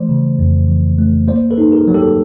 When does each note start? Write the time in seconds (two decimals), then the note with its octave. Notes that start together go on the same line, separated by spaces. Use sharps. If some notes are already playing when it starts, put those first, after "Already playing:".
Already playing: E3 A3 C5 D5
0.09 C#3
0.39 F2
0.68 E3
0.98 A3
1.28 A#3 C5 D5
1.51 A4 B4
1.58 D#4
1.72 G#4 A#4
1.87 F#3
1.94 G4 A4